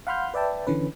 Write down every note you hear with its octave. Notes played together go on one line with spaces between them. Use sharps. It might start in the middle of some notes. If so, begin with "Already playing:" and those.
F5 F#5 B5 C6 F6 G6
B4 D5 E5 G5 A5
D3 E3 C#4 B4